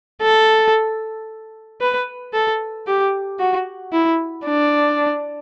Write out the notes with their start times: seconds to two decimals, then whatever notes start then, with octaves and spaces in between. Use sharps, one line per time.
0.22 A4
1.81 B4
2.34 A4
2.87 G4
3.39 F#4
3.92 E4
4.45 D4